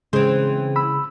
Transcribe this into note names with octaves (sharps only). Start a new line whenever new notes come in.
C#3 E3 G#3 C4 G#4
B5 E6